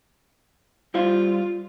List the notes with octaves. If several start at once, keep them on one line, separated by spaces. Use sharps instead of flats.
G3 F4 C5 F5